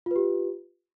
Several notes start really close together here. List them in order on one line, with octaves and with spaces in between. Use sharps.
F4 B4 G4